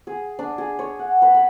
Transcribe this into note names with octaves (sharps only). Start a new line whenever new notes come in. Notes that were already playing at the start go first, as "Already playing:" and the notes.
G#4
D4
G#4
C#5
F#5
B4
B5